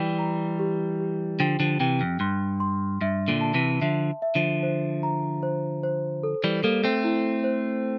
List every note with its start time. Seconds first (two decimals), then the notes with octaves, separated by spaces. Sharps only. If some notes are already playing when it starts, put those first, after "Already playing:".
Already playing: E3 G3 G5
0.19 A#5
0.59 G4
0.99 G4
1.40 D3 F3 G5
1.60 D3 F3
1.80 C3 E3 G5
2.01 F2
2.20 G2 C6
2.60 C6
3.01 G2 E5
3.28 A#2 D3
3.41 A5
3.54 C3 E3
3.82 D3 F3 E5
4.22 E5
4.35 D3 F3
4.63 C5
5.03 A#5
5.43 C5
5.83 C5
6.23 A4
6.44 E3 G3
6.64 G3 A#3 A4
6.84 A3 C4
7.04 E4
7.44 C5